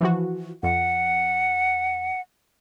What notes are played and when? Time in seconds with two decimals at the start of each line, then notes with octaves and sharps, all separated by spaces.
0.01 E3 F3 F#4
0.63 F2 F#5